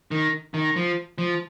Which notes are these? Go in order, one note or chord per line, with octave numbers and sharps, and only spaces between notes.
D#3
D#3
F3
F3